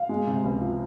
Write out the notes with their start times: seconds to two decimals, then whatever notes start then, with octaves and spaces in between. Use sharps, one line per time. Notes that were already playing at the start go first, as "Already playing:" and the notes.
Already playing: F5
0.09 G#3
0.27 C3
0.44 C#2
0.61 F3